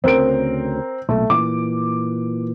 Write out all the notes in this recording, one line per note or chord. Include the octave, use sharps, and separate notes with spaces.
D2 C#3 C4 A#4 D7
B1 A#2 A3
A#2 E3 D6